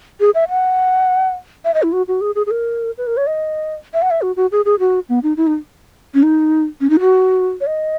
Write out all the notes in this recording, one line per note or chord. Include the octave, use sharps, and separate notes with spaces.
G#4
E5
F#5
E5
D#5
E4
F#4
F#4
G#4
G#4
G#4
A#4
B4
A#4
C#5
D#5
E5
F#5
E5
F#4
F#4
G#4
G#4
F#4
B3
D#4
E4
D#4
C#4
D#4
C#4
D#4
F#4
C#5
D#5